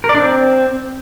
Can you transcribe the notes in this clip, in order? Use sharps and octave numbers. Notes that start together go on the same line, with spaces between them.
A#4
D5
D4
C4